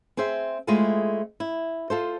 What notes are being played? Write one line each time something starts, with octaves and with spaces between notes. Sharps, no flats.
C4 G#4 C5 E5
G#3 A3 C4 E4 F4 G#4
E4
F4 A4 C5